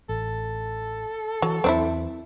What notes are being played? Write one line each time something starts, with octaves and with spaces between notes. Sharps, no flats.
A1 A4
E3 F#3
E2 F#3 C4 D4 E4